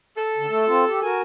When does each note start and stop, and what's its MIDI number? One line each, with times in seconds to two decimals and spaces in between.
0.17 1.17 69
0.37 0.46 50
0.49 0.65 57
0.67 0.84 60
0.67 0.84 65
0.88 1.00 67
1.02 1.22 66
1.02 1.22 70
1.02 1.22 80